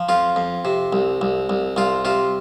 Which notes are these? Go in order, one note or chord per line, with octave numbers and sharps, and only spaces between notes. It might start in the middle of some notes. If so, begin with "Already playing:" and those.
Already playing: F3
F2 F4
F2
C3
C2
C2
C2
C2 F4
C3 F4